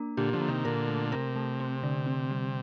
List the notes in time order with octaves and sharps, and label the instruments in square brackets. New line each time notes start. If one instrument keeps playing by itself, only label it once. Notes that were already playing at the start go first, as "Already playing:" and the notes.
Already playing: [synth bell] A#3 D4
[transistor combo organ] A#2 D3 [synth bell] G4
[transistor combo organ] D3 F3
[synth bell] A#3
[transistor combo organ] C3 D#3
[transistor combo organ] A#2 D3 [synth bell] A#4
[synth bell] A3
[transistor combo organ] C3 [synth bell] A#4
[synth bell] A3
C4
D3
C4
G3